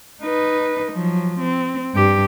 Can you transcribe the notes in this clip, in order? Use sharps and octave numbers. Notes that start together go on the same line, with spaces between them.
D#4 B4
F3 F#3
C4
G2 G4